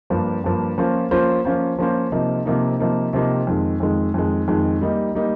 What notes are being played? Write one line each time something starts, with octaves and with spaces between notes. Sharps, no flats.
G2 F3 A#3
G2 F3 A#3
F3 A#3 C#4 F4 C5
F3 A#3 C#4 F4 C5
F3 A#3 C#4 F4 C5
F3 A#3 C#4 F4 C5
C3 F3 A#3 D#4
C3 F3 A#3 D#4
C3 F3 A#3 D#4
C3 F3 A#3 D#4
F2 D#3 G#3
F2 D#3 G#3
F2 D#3 G#3
F2 D#3 G#3
G3 A#3 D#4
G3 A#3 D#4